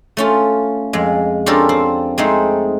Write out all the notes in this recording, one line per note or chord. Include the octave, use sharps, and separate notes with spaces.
A3 C#4 F4
F2 G#3
C#4 D4 F4 G4 A4 A#4
C4
G#3 A3 C4 D#4